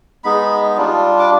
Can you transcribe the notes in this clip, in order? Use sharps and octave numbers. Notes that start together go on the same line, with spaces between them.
G#3 B3 D#4 B5
G3 D4 F4
D6